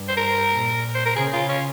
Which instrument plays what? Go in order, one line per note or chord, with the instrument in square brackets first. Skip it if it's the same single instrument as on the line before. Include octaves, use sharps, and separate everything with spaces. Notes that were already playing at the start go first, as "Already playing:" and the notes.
Already playing: [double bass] G2
[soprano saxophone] C5
A#4
[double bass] A#2
[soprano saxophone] C5
A#4
[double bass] C#3 [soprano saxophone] G#4
[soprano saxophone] F4
C#4